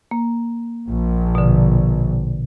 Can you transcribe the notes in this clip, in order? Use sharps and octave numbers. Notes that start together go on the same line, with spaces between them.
A#3
A#1
B2 D3